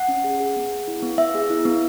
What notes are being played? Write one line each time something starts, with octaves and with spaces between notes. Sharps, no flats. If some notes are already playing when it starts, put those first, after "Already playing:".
Already playing: F#5
C#4
G#4
G#4
B3
G#4
E4
B3
B3 E5
G#4
E4
B3